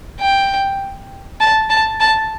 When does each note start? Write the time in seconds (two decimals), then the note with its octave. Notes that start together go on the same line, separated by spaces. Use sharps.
0.20 G5
1.40 A5
1.70 A5
2.00 A5